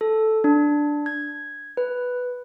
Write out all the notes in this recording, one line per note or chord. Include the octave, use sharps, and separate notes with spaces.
A4
D4
G#6
B4